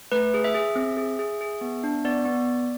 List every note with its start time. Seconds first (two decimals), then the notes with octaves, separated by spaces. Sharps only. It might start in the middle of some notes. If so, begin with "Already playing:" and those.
0.12 A3 B4
0.34 G#4
0.44 E5
0.55 G#4
0.76 C4
0.97 G#4
1.19 G#4
1.41 G#4
1.61 B3
1.84 D4
2.04 B3 D5
2.25 B3